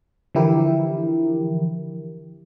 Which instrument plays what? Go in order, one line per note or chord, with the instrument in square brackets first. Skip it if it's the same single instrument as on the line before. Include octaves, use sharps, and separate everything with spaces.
[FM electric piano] D3 E3 F3 E4 G4 A#4